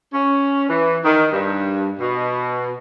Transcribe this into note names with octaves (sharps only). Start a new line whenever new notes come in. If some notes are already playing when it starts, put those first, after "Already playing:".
C#4
E3
D#3
G2
B2